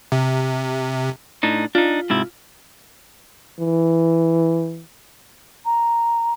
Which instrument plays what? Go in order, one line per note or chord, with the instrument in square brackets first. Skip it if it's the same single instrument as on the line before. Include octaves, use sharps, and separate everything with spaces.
[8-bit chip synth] C3
[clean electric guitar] A2 D4 D#4
[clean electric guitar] D4 D#4 [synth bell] F4
[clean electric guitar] G#2 C3 E4
[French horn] E3
[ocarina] A#5